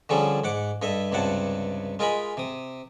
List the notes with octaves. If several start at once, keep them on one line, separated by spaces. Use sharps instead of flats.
D3 F3 G3 C#4 G#4 A4
G#2 F#5 D6
G2 A4 D#5 E5
C#2 G2 C3 F#5 A5
G#3 F4 A#4 D#5 G#5 B5
C3 D#6